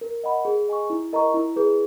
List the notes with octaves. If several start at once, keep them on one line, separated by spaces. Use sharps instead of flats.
A#4
D#5 F#5 B5
G#4
D#5 G#5 C#6
E4
A#4 D#5 A#5 C#6
E4
G#4 B4